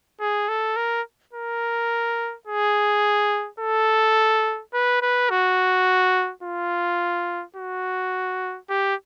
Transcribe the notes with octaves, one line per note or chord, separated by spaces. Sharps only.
G#4
A4
A#4
A#4
G#4
A4
B4
B4
F#4
F4
F#4
G4